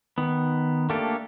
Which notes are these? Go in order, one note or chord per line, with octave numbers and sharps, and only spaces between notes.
D#3 B3
A3 A#3 D4 G4 A4